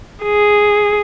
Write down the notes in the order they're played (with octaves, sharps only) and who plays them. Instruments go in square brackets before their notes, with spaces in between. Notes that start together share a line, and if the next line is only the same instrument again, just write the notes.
[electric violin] G#4